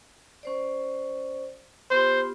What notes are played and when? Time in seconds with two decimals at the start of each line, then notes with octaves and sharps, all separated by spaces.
0.43 C#4 C5 D5
1.91 B3 F4 G4 C5